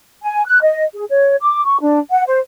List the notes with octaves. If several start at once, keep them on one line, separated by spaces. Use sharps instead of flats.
G#5
F#6
D#5
G#4
C#5
D6
C#6
D4
F#5
C5